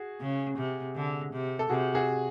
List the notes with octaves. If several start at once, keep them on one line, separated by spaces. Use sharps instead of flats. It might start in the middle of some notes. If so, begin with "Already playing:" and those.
Already playing: F#4 G#4
C#3
C3
D3
C3
A4
C3 F#4 G#4
F#4 G#4